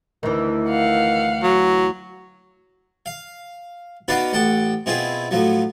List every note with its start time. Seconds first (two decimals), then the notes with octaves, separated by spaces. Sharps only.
0.23 D2 D#3 E3
0.67 F5 F#5
1.43 F#3
3.06 F5
4.08 B3 D#4 F#4 B4 D5 F5
4.33 A1 F#5 G5 A5
4.86 B2 C4 E4 F4 G#4
5.31 A2 F3 F#3